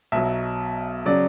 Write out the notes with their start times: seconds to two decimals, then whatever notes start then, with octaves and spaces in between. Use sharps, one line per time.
0.12 B1 B2 F#3 E5
1.06 C#3 F#3 D5